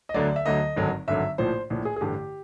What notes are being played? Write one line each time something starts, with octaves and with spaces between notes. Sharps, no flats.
D#5
D2 D3 F#3 D5
E5
D2 D3 F#3 D#5
G#1 G2 D3 F#3
G#1 G2 D3 F#3 E5
A#1 A2 F3 C5
A#1 A2 F3
G#4
G#4
A1 G2 D3 G4